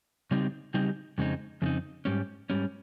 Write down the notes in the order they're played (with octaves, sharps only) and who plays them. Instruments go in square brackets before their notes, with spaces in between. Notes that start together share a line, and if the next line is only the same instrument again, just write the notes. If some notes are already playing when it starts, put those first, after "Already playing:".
[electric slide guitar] C#3 G3 C4 D#4 G4
C#3 G3 C4 D#4 G4
F2 C#3 G#3 C4 D#4
F2 C#3 G#3 C4 D#4
G#2 G3 C#4
G#2 G3 C#4